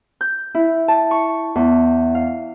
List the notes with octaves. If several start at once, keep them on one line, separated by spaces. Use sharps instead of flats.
G6
E4
A5
C#6
E2
F5